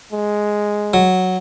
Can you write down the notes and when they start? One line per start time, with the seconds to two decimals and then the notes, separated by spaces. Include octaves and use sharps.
0.12 G#3
0.94 F#3